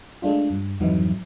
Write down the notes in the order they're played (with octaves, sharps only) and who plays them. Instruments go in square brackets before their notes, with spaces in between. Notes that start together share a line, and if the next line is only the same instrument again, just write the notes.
[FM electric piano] G#3 A3 D4 F4
G2
F2 G#2 E3 F#3 D#4 E4